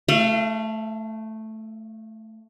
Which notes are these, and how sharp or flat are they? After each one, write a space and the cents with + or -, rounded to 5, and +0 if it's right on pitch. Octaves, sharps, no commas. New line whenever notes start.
A3 +0 F5 -40